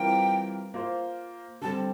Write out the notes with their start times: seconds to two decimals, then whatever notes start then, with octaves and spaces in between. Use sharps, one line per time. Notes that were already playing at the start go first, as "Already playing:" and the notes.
Already playing: E3 G3 C4 F4 A#4 G5
0.74 A#3 F4 C5
1.61 D3 G3 C4 A5